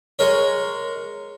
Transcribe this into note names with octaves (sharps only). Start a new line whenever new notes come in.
G#3 A#4 C#5